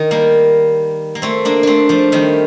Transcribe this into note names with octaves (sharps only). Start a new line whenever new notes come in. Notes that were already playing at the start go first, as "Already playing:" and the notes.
Already playing: D#3
G3 A#3
A#3
A3 C4
A#3 D4
A3 C4 D4
F3 A3
D#3 G3